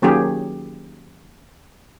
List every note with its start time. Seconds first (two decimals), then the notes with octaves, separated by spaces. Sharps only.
0.02 D#3 F#3 A#3 C#4 G4 G#4